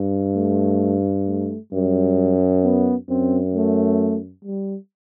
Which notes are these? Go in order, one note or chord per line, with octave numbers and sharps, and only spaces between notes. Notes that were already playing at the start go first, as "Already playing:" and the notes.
Already playing: G2
A3
A3
F#2 G3
B3
F#2 C4
A3
G3